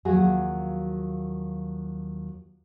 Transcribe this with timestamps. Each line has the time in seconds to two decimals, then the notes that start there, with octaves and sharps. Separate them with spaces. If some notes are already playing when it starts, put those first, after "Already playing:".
0.05 D#2 F3 F#3 F#4 G#4